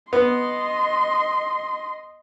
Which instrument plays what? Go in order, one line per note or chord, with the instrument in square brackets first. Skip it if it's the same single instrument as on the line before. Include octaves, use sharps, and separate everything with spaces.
[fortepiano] B3 [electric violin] D#5 C6